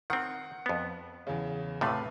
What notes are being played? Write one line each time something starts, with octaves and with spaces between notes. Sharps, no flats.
D#3 C4 F#5
F2 B3
E2 C#3
A2 C3 A3 B4 F5 B5